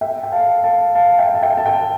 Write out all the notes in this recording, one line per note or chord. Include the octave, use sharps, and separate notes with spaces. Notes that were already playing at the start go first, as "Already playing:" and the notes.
E5 G5
G5
F5 A5
F5 A5
F5 A5
E5 G5
A5
E5 G5
A5
E5 G5